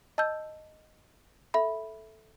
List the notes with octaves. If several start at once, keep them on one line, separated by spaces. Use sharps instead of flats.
D#5 A5 E6 G6
A4 E5 B5